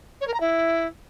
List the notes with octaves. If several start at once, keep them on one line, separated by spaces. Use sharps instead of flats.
C#5
A#4
A#5
E4